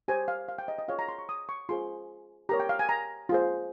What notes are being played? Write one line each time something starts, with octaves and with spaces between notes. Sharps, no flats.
G4 C5 G#5
F5
F5
G5
D#5
D#5
F4 G#4 C#5 F5
A#5
C6
C#6
D#6
C#6
F4 G#4 C5 C6
G4 A#4 C#5 A#5
G5
F5
G#5
A#5
F4 G#4 C5